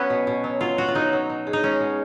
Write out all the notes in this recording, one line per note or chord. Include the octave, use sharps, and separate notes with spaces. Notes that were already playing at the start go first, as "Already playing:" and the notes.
Already playing: F#3 B3 C#4 F#4
B2
B2
F#3
F#3 F4
F#3 F#4
F4
F#3 D#4
F#3
B2
G#3
D#4
G#3 C#4
B2